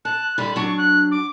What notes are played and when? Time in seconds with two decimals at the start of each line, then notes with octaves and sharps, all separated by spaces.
0.05 A5 F#6
0.38 D3 G3 B5
0.56 F#3 D4 C#6
0.78 F#6
1.11 D6